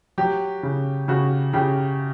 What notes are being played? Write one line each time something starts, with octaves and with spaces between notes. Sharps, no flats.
F#3 G4
C#3
C#3 F#4
C#3 G4